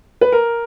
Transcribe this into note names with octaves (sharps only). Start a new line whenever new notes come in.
B4
A#4